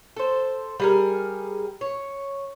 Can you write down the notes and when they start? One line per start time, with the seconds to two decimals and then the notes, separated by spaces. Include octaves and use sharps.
0.17 A4 C5
0.80 G3 G#4 A#4
1.81 C#5